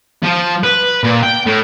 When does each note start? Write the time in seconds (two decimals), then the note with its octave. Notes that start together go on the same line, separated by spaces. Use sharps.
0.23 F3
0.64 B4
1.03 A#2
1.23 G5
1.46 A2